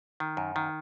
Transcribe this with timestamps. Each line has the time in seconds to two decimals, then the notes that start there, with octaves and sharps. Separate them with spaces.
0.20 D#3
0.37 F#2
0.56 D#3